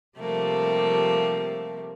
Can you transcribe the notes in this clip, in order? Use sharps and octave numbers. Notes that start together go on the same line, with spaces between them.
C3 F3 G3 A3 A#3